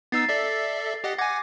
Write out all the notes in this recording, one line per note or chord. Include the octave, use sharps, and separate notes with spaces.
B3 D#4 E6 A6 C7
A4 D5 E5
G4 D#5 F#5
F#5 G#5 D6 G#6 A#6